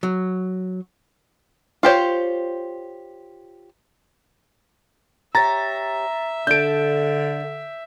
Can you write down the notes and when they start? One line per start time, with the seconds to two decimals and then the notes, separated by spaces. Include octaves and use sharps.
0.03 F#3
1.83 F4 G4 C5 C#5
5.35 G4 C#5 E5 A#5 A6
6.47 D3 D4 A4 G6 D7